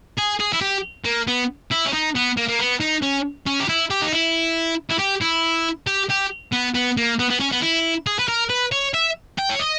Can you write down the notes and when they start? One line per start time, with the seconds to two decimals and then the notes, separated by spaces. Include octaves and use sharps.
0.18 G#4
0.40 G#4
0.53 E4
0.61 G4
1.05 A#3
1.28 B3
1.72 E4
1.86 C#4
1.93 D#4
2.15 B3
2.37 A#3
2.48 A#3
2.59 B3
2.80 D#4
3.02 C#4
3.46 C#4
3.60 G4
3.69 E4
3.91 G4
4.02 D#4
4.13 E4
4.91 E4
5.00 G4
5.22 E4
5.87 G4
6.10 G4
6.53 B3
6.75 B3
6.97 A#3
7.19 B3
7.30 B3
7.40 C#4
7.52 B3
7.62 E4
8.06 G#4
8.19 B4
8.28 A#4
8.50 B4
8.72 C#5
8.94 E5
9.38 G5
9.49 C#5
9.59 D#5